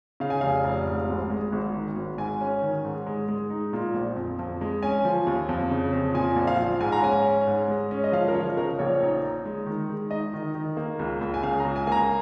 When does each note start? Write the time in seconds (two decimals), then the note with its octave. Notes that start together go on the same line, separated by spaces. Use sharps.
0.20 C#3 F5
0.30 G#5
0.41 F1 F5
0.64 F1
0.87 G#2
1.09 G#1
1.30 G#3
1.52 G#1
1.74 D#3
1.96 G#1
2.18 G#2 G#5
2.41 C#4
2.62 D#3
2.84 G#2
3.06 G#3
3.28 G#3
3.50 D#4
3.73 A#2
3.94 A#1
4.16 F2
4.39 F2
4.61 G#3
4.83 C#4 G#5
5.05 F3
5.27 D#2
5.49 F2
5.71 C#3
5.93 F2
6.14 A#2 G#5
6.36 A#1
6.47 F5
6.59 F3
6.81 G#2 G#5
6.92 A#5
7.02 C#4 G#5
7.24 C#4
7.47 G#2
7.68 G#3
7.91 C#4
8.04 D#5
8.12 F3 F5
8.28 A#4
8.34 F3 C#5
8.57 C#3 A#4
8.79 A#1 C#5
9.01 D#4
9.23 D#4
9.45 G#3
9.66 D#3
9.89 G#3
10.11 D#4 D#5
10.33 D#3
10.55 D#3
10.77 A#3
10.99 C#2
11.21 C#2
11.34 G#5
11.43 C#3 F5
11.60 A#5
11.65 C#2
11.76 G#5
11.87 A#3 G#5 A#5